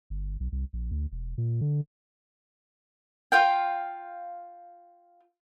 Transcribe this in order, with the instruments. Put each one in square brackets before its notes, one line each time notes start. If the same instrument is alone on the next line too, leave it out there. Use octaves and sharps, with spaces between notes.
[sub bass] G1
B1
C2
A#1
D2
E1
A#2
D3
[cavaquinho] F4 F5 G5